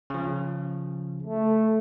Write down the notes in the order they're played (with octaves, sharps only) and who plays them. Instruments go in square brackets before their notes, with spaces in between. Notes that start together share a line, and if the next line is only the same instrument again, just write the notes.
[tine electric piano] C#3 F3
[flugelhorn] A3